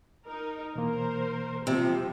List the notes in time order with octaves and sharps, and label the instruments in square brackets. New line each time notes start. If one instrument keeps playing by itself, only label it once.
[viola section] D#4 A#4
[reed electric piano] B2 E3 A#3 [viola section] A#4 C5
[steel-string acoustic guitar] C3 [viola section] F3 G3